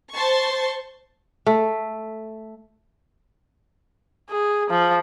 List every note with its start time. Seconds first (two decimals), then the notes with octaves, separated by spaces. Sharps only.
0.13 C5 A5 C6 C#6
1.46 A3
4.30 G#4
4.70 F3